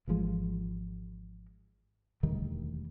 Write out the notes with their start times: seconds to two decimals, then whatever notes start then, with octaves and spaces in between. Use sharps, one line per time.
0.08 G#1 E3 F3 G#3
2.23 E1 D2 D#3 G3